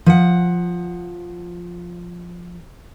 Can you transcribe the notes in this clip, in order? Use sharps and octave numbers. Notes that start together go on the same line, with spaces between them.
F3 F#5